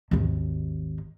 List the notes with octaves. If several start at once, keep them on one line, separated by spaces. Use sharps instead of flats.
G#1 D#2